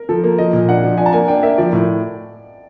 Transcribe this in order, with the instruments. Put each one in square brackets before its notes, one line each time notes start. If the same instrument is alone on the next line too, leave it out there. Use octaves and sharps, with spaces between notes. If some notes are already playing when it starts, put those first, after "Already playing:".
Already playing: [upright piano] A#4
[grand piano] F3 [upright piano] A4
[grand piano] A#3
[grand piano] F3 [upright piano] D#5
[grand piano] A#2
[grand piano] D4 [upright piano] F#5
[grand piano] F3
[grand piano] D4 [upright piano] G#5
[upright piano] A5
[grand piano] A#3 [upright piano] G#5
[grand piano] D4 [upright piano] G5
[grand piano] A#3 [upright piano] E5
[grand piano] F3 [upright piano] D5
[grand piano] A2